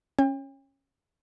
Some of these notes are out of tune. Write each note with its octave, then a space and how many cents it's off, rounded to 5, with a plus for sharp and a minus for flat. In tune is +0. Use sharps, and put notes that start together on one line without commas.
C#4 -15 G5 +40